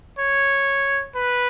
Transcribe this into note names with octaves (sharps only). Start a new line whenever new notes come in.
C#5
B4